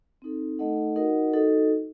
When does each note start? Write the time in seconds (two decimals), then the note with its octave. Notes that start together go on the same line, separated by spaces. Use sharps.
0.22 C4 D#4 A4
0.59 A3 D#4 A4 D#5 F#5
0.96 D#4 F#4 A#4 D#5 F#5
1.33 D#4 F#4 A4 D#5